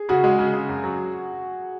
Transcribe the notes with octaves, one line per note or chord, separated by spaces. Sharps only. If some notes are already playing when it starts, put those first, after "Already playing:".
Already playing: G#4
C#3 F#4
G#3
C#3
C#3
F#2
F#3